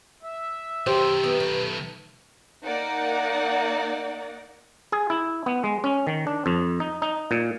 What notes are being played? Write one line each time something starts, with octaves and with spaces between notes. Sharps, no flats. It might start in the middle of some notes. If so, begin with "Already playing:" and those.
E5
B1 D#3 G4 C5
B3
A3 B4
A#3 D#4 D5 F#5
G#4
E4
B3
G#3
C#4
D#3
D4
F2
D#4
D#4
A#2